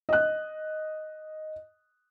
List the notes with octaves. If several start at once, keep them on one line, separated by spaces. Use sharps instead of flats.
D#5 F#6